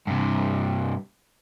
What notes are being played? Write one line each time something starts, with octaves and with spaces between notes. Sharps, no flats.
G2 C3